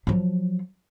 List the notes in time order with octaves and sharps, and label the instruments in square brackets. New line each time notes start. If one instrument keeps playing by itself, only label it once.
[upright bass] F3 F#3